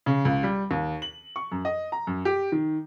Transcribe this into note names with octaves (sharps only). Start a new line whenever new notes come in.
C#3
C#2
G3
D#2
F#7
C#6
F#2
D#5
A#5
F#2
G4
D#3